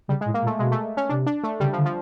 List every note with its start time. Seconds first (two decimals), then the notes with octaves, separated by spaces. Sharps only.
0.08 C#3 G3
0.21 G#3
0.26 A2
0.34 A#3
0.42 A#2
0.47 A3
0.59 B2 G#3
0.72 A3
0.97 C#4
1.09 C3 D4
1.26 D4
1.44 A3
1.60 C#3 G3
1.73 F3
1.78 D3
1.86 F3